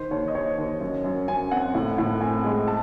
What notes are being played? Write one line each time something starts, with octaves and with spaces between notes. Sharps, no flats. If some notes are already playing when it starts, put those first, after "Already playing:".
Already playing: D#3 C5
D#2 C#5
D#5
D#2 C#5
D#2
F#2
F#2
F#2 G#5
C4 F#5
A2
A2
C4 G#5
G#3
A5